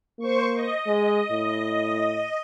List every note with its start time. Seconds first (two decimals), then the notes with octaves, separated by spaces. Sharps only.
0.19 A#3 C5 C#6
0.54 D#5
0.87 G#3
1.31 A2